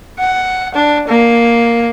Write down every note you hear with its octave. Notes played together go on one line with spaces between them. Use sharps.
F#5
D4
A#3